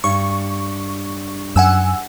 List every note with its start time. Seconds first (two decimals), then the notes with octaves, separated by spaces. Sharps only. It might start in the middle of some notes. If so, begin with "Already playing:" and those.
0.04 G2 C#6
1.56 F#2 F#5 G#5 E6